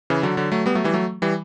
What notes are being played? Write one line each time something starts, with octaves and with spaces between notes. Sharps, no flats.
C#3 E3
D3 F#3
D3 F#3
F#3 A3
G3 B3
F#3 A3
E3 G3
F#3 A3
E3 G3